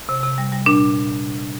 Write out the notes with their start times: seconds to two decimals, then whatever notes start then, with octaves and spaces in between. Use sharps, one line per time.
0.09 C3
0.24 C3
0.38 G3
0.52 G3
0.66 A#2 D4